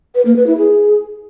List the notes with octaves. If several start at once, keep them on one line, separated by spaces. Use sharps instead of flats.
B4
A#3
B4
E4
G#4